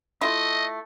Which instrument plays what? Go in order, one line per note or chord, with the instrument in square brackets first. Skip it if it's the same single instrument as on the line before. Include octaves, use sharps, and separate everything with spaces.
[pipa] A3 E4 F4 [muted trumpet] D#5